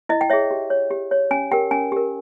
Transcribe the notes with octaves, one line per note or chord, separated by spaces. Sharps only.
E4 D#5
G5
G#4 C#5 E5
G4
C#5
G4
C#5
C#4 G#5
G4 A#4 G5
C#4 G#5
G4 A#4